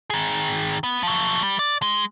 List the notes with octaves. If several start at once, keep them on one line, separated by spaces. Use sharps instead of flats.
D#3 G#4
B3
F3 F#3
G3
D5
G#3